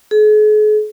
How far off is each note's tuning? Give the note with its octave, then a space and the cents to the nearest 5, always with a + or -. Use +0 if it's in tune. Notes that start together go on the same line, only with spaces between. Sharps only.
G#4 +45